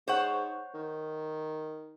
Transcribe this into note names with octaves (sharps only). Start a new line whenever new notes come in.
G#2 C5 C#5 F#5
D#3